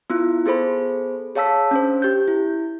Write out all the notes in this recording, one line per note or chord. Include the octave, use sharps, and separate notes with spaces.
B3 E4 F4
B3 G#4 A4 C5 B5
G#4 C#5 F5 A5 E6 B6
C#4 D4 C5
G4 G6
E4